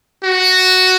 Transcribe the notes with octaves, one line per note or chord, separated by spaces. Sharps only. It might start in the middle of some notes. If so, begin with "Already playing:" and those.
F#4